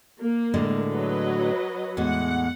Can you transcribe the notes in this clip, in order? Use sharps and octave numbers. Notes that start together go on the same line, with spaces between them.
A#3
A2 D3 G#3
F#3 B4 D#5
E2 A2 G#3 F#5